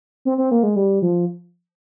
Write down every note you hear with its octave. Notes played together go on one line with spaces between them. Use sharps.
C4
C4
A#3
G#3
G3
F3